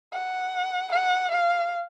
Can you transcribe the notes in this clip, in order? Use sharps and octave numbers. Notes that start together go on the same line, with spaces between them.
F#5
F#5
F5